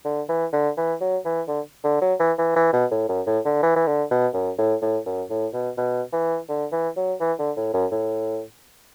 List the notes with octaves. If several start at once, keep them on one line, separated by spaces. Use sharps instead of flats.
D3
E3
D3
E3
F#3
E3
D3
D3
F#3
E3
E3
E3
B2
A2
F#2
A2
D3
E3
E3
D3
B2
F#2
A2
A2
F#2
A2
B2
B2
E3
D3
E3
F#3
E3
D3
A2
F#2
A2